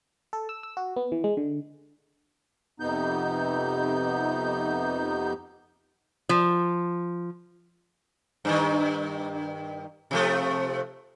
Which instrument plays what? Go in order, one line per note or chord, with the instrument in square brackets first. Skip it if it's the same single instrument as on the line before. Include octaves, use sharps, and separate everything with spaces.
[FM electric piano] A4
E6
E6
F#4
B3
E3
G#3
D3
[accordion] F2 C3 B3 D#4 G6
[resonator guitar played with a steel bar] F3
[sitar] G2 D#3
C3 F3 A3